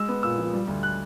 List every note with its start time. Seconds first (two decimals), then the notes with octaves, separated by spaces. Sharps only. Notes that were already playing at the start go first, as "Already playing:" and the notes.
Already playing: G#3 E6
0.09 B3
0.23 A#2 E6
0.38 F3
0.54 G3
0.68 D2
0.83 F#6